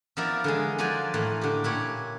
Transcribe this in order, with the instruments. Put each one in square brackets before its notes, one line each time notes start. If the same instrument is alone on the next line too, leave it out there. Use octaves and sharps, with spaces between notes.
[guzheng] F3 B3 E4 A#4 D5 E5
D3 E3 G#3
F3 F#3 C5 D5 G#5
A2 E3 A#3
D3 G4
A#2 D4 E4 G4 C#5